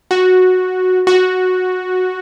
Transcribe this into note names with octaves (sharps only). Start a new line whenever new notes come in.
F#4
F#4